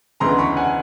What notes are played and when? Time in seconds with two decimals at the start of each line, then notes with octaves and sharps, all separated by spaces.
0.20 D2 C#3 E3 G#3 B3 A#5 C6
0.39 B5 C#6
0.56 F#5 G#5